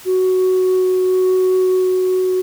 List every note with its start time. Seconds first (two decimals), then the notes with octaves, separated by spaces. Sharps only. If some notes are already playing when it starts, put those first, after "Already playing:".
0.05 F#4